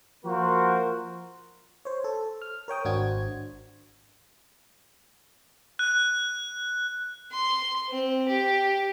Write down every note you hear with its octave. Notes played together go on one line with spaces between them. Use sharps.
F3 A#3 F#4 A#4 C5
C5 C#5
A4
F6
A#4 C#5 G5 D#6
G#1 D4 F#4 C5 G#6
F#6
C6
C4
G4